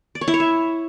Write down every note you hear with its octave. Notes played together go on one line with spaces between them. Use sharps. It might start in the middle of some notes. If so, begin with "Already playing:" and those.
D5
C#5
E4
C#5
E5